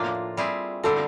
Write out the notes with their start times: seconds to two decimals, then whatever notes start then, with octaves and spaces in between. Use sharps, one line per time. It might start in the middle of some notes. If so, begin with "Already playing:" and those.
Already playing: A2 F3 A#3 D4 F4
0.37 G3 C4 E4 G#4
0.83 D3 G3 C4 A4